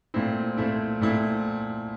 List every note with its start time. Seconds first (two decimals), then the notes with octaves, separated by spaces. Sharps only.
0.14 A#2 A3 C4 E4
0.57 A#2 A3 C4 E4
1.01 A#2 A3 C4 E4